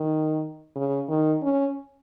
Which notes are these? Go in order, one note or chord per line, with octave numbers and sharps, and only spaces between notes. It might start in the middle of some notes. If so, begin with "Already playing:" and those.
Already playing: D#3
C#3
D#3
C#4